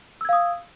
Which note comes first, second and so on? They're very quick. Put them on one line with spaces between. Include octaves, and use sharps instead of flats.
E6 G#6 F5 D#6